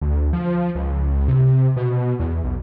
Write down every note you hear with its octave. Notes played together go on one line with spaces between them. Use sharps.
D2
F3
C#2
C3
B2
E2
B1